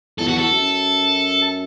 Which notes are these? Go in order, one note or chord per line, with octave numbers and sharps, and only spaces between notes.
E2 A4
F#4
A4
F#2